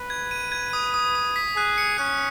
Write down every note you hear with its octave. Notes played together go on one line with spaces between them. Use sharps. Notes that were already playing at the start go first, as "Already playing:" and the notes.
Already playing: B4
G#6
D#7
G#6
D#6
D#6
D#6
B6
G#4 F#6
C#7
C#4 F#6